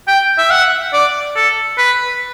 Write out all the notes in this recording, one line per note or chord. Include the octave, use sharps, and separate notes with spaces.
G5
E5
F#5
D5
A4
B4